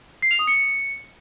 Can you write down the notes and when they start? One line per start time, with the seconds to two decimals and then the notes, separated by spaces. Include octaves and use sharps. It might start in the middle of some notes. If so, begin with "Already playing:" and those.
0.22 C7
0.31 F7
0.39 D#6
0.47 C#7